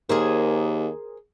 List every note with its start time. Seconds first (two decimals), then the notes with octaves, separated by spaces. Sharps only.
0.09 D#2 G#4 A#4 C5